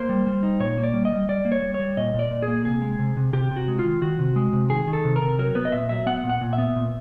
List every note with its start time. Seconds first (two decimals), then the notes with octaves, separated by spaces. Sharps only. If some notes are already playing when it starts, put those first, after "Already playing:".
Already playing: A#3 C5
0.09 G3
0.27 G3
0.43 D#4
0.60 A#2 C#5
0.78 A#3
0.83 D5
0.94 G3
1.05 D#5
1.12 G3
1.29 G3 D5
1.45 A#3
1.52 C#5
1.62 G3
1.74 C#5
1.79 G3
1.97 A#2 D#5
2.14 A#2
2.19 D5
2.31 A#2
2.42 G#4
2.48 A#3
2.65 C3 G#4
2.82 G#3
2.99 C3
3.17 C3
3.33 C3 G4
3.51 C3
3.56 F#4
3.68 G#3
3.79 F4
3.85 D#3
4.01 D#3 F#4
4.19 C3
4.36 G#3
4.53 C3
4.70 D#3 G#4
4.87 D#3
4.93 A4
5.04 C3
5.16 A#4
5.22 C3
5.39 F#3 A#4
5.55 B3 B4
5.65 D#5
5.72 A#2 E5
5.89 F#3 E5
6.06 B3 F#5
6.24 A#2
6.29 F#5
6.41 A#2
6.53 E5
6.58 B3
6.76 A#2